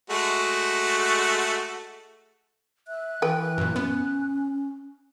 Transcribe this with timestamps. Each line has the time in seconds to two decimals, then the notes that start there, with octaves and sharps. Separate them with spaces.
0.10 G#3 A3 F#4
2.88 E5 F#6
3.22 E3 B4 G5
3.58 F#2 A#2
3.76 B3 C#4